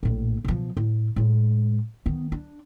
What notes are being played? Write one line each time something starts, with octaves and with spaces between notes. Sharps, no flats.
A#1 A2
B2 F3
A2
A2 G#3
D#3 B3
D4